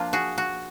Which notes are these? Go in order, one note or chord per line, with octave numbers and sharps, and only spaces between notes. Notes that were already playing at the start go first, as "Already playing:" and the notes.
Already playing: F3 A#3 D4 F4
F#4 G#4
F#4